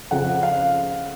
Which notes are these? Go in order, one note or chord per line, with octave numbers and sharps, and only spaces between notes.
F2 C#3 F3 F#5
F5